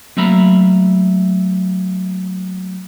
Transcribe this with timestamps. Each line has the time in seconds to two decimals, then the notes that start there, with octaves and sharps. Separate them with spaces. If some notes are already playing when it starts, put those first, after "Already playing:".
0.17 F#3 A3 A#3 E5 A#5 B5